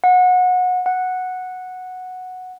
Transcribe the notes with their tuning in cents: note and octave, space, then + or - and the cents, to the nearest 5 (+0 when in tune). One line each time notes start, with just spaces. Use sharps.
F#5 -25
F#5 -5